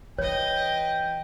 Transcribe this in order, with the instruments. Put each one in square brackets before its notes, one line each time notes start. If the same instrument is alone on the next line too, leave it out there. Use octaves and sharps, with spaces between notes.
[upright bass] E3 [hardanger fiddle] B4 D#5 [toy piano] C#5 [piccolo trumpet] G5